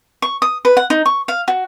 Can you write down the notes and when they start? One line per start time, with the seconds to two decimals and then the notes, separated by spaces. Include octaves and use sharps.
0.22 C#6
0.42 D#6
0.65 B4
0.77 F#5
0.90 D#4
1.06 C#6
1.28 F5
1.48 F#4